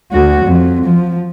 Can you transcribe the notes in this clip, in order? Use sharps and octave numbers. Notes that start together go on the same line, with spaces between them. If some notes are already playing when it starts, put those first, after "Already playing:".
D2 F#4
F2
F3